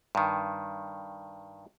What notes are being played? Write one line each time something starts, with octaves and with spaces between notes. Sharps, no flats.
G2 D#3